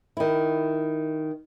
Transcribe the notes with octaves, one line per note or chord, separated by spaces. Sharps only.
D#3 E4